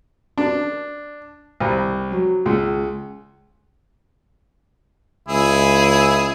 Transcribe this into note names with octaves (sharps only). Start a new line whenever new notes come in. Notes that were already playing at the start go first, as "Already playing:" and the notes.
D4
C2
F#3
C#2
C#2 E4 G#4